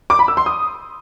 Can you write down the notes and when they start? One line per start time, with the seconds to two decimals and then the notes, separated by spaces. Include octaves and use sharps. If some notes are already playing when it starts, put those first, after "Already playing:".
0.10 D6
0.19 B5
0.28 E6
0.37 C6
0.46 D#6